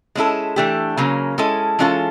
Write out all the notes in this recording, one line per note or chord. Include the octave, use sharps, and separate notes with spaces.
G#3 C#4 E4 A4
E3 A3 D4 G4
C#3 F#3 A#3 C#4
G#3 C#4 E4 A4
E3 G#3 C#4 F4 A4